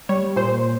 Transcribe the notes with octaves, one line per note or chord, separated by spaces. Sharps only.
G3 C#5
A#2 C5